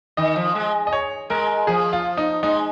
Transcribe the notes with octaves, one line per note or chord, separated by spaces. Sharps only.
D#3 D#5
F3
G#3
D#5
C#5
G#3 A#4
F3 G#4
F4
D#4
G#3 D#4